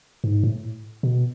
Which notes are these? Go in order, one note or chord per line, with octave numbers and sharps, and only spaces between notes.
G#2
A2
B2